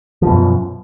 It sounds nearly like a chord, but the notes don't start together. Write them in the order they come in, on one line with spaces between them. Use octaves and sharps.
F3 B2 F#2